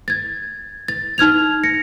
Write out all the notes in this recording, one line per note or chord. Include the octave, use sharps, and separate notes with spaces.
G#6 A6
A6
D#4 F6 G#6 F7
A#6 C#7